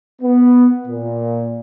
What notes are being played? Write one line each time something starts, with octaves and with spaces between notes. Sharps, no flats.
B3
A#2